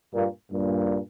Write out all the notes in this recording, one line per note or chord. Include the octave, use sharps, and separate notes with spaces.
G2 A#2
G2 A#2